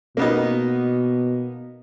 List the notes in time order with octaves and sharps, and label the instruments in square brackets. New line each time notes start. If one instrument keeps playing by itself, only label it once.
[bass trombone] B2 [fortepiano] A#3 B3 D#4